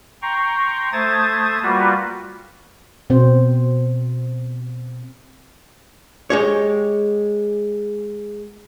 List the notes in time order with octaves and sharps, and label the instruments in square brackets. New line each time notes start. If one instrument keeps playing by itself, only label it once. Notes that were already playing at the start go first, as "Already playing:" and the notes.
[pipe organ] G5 A#5 C6 C#6
A3 C5 A5 D#6 G#6 A6
G3 A#3 F4 F#4 B4
[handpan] B2 C4 C5
[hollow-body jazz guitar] G#3 G4 C#5